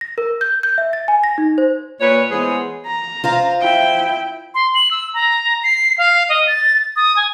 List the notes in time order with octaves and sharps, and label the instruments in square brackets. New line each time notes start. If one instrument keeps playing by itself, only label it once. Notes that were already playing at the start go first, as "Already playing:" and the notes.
[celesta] A#6
A#4
G6
G6
E5
A6
G#5
A#6
D#4
C5
[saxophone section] A#2 B4 C#5
E3 G#3 B3 G#4 C5 C#5
[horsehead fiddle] A#5
[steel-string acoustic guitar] F4 C5 F5
[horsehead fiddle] E4 G5
[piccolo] C6
F#7
E6
A#5
C7
F5
D#5
A6
D#6
G#5